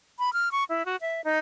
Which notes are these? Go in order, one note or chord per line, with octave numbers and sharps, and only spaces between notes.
B5
F6
C#6
E4
F#4
E5
D#4